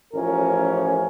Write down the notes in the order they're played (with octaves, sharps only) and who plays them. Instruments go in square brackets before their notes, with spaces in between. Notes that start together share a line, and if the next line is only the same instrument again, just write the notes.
[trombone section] A1 F3 C#4 A#4